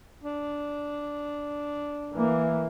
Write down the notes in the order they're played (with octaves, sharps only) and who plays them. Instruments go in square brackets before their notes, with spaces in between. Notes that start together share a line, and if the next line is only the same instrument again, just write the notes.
[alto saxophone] D4
[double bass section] E3 A#3